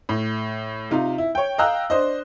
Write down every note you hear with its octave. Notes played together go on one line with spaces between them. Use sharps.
A2
C3 D#4 F4
E4
C#5 G5
D#5 F5 G5 A#5 E6 F#6
D4 C5 D#5